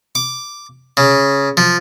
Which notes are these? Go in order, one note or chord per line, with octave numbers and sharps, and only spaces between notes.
D6
C#3
F3